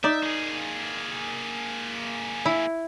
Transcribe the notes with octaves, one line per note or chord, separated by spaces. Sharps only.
D#4 D5 E5
A#3 G#4
E4